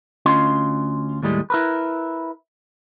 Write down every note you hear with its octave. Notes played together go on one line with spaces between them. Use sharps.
D2 C#4 F4 D#5 C6
D#2 A2 G3 G#3
E4 A#4 B4